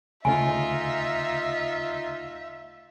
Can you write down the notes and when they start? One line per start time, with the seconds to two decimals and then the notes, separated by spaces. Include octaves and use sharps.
0.25 D2 C#3 A3 D#4 F4 E5 G#5